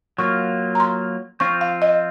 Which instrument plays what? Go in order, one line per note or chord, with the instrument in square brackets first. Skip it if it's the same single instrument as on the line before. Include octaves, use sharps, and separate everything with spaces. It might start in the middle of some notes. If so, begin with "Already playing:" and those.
[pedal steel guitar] F#3 A#3 F4 [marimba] C#6
[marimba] A#5
C6
[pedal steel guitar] F3 C4 F4 [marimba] C#6
[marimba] F5
D#5